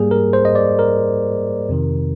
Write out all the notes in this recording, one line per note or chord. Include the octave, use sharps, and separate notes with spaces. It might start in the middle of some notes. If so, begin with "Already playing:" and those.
Already playing: G#2 G3 A#3 G#4
A#4
C5
D#5
D5
A#4
F2 C3 D#3